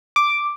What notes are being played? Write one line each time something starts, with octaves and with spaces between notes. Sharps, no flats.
D6